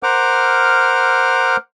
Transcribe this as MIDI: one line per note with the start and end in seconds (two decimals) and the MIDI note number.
0.03 1.57 70
0.03 1.57 72
0.03 1.57 78
0.03 1.57 86
0.03 1.57 89